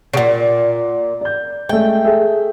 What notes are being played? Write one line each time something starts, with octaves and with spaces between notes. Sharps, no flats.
A#2 C#3 F#5 D7
D5 G6
G#3 A3 G5
G#4 A4 E5